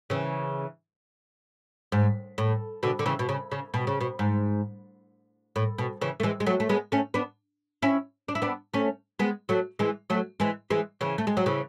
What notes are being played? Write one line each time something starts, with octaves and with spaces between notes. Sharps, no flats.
C#3 E3
G#2
A2
B2 D3
D3
C#3 E3
B2
C#3
C#3
B2
C#3
B2
G#2
A2
B2
C#3 E3
A3
E3 G#3
G#3
F#3 A3
A3
G#3 B3
A3 C#4
B3 D4
C#4 E4
D4
E4
B3 D4
A3 C#4
G#3 B3
F#3 A3
E3 G#3
F#3 A3
E3 G#3
E3 G#3
C#3 E3
A3
G#3
F#3
C#3 E3